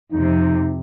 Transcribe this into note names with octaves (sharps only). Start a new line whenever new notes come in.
F2 C3 D#4